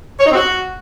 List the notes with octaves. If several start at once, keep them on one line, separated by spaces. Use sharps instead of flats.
C#5
D#4
C4
F#4